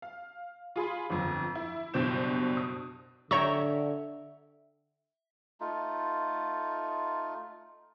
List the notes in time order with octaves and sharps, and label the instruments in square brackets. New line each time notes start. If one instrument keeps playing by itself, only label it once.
[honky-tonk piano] F5
F4 G#4 B5 C6
G1 F2
E4
F#1 G2 B2 C5 G6 E7
D#6
[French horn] D3 [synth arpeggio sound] C#5 A#5 C#6 [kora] E5 G5
[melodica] A3 D#4 F4